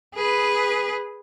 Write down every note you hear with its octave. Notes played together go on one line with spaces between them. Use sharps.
G#4 B4